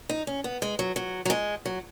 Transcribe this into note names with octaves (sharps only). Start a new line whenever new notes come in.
D#4
C#4
B3
G#3
F#3
F#3
F#3
G#3
F#3